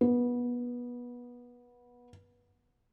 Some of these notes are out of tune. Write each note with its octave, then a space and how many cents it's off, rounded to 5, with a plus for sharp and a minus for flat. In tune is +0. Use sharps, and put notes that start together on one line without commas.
B3 -20